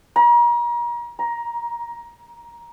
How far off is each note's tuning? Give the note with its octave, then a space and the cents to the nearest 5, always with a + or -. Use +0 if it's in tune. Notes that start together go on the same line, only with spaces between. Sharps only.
A#5 +35
A#5 +15